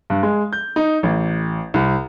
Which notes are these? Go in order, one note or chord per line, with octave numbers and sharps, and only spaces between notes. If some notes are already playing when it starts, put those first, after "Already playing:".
G2
G#3
G6
D#4
A1
C2